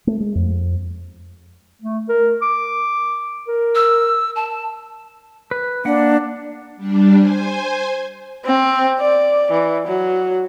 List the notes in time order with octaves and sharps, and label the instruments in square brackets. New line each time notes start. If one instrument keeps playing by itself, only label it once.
[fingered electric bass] A3
G#3
F2
[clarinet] A3
A#4
D6
A#4
[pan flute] E6
A5
[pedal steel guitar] B4
[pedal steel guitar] A#3 F#5 [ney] D4
[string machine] G3 D4
C5 G#5
[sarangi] C4
D5
E3
F#3